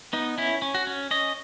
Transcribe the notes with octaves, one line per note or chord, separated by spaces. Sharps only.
B3 D#4
C#4 E4
C#4
F#4
C#4
C#4 D#5